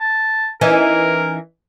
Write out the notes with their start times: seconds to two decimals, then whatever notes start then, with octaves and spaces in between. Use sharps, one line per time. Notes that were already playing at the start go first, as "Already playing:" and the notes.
0.01 A5
0.61 E3 C#4 D#4 A#4